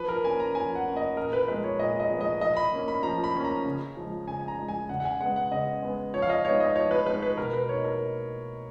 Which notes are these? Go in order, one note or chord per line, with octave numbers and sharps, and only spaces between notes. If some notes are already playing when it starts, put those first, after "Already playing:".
Already playing: F3 B4
A#4
A#3 C#4 G#5
A#5
F3 G#5
F#5
A#3 C#4
D#5
A#2 A#4
B4
F3 G#3 B3 B4
C#5
A#2 D#5
D#5
F3 G#3 B3
D#5
F3 D#5
B5
A#3 C#4
B5
F3 A#5
B5
A#3 C#4
A#5
C#3
F3 G#3
C#3 G#5
G#5
A#5
F3 G#3
G#5
C#3 F#5
F#5
G#5
G#3 B3 F#5
F#5
C#3 D#5
G#3 B3
F3 C#5
F5
D#5
G#3 B3 D#4 C#5
D#5
F3 C#5
B4
G#3 B3 D#4 B4
B4
B2 A#4
B4
A#3 D#4 C#5
A#4